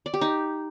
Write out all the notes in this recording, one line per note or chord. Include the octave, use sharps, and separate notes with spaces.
D5
G4
D#4